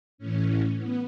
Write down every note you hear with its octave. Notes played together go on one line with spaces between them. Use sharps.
A2 E3 C#4
B3